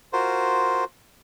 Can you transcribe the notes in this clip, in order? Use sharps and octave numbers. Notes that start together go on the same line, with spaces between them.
F4 F#4 A#4 C5